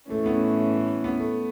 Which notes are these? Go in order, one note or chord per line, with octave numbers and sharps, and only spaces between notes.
A2 E3 A3 C#4
B3
B3
A3